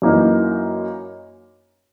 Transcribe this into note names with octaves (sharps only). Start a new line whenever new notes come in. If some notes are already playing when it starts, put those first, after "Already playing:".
F#2 E3 A#3 D#4